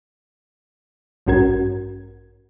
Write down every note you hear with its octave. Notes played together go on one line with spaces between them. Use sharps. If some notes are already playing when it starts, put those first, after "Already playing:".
A1 G2 C#4 F#4 A#4 G#6